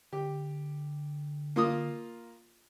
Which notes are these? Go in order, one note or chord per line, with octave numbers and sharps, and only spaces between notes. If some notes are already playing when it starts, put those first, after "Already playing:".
D3 G4
A#3 F4 D#6